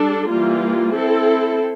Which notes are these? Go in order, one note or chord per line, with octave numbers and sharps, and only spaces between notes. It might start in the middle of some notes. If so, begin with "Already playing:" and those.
Already playing: G3 D4 A4
E3 G3 A#3 F4
C4 E4 A4